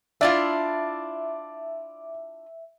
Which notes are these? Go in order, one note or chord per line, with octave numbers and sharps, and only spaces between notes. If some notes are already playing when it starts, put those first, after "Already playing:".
D4 E4 F4 D5 E5